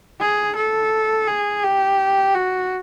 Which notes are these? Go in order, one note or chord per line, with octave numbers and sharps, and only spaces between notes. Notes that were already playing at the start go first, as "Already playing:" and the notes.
G#4
A4
G#4
G4
F#4